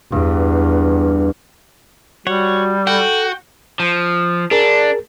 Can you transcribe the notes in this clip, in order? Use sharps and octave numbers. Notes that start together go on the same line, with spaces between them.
E2 G2
G3 F#4 C#5 F#5
F#4 A4 G5
F3
D4 G#4 A#4